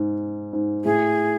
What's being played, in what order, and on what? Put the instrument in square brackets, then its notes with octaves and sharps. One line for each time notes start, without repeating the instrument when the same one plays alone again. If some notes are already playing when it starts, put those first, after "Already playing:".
Already playing: [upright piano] G#2
G#2
[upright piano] A2 [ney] G#4